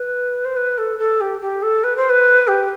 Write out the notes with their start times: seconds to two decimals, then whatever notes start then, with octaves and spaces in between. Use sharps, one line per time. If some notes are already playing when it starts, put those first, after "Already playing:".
Already playing: B4
0.45 C5
0.57 B4
0.78 A4
0.99 A4
1.21 G4
1.41 G4
1.63 A4
1.84 B4
1.97 C5
2.10 B4
2.48 G4